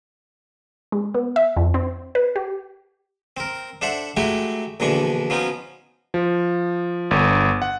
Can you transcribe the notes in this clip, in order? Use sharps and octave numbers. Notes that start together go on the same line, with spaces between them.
G#3
B3
E5
F2
C4
B4
G4
C4 A#4
D4 A4 C5 E5 F#5
F#3 G#3 A3 E4 F#4 G4
A#1 B2 D3 E3 D4 C#6
F3 F#3 B3 C#4 D#4
F3
G1
F#5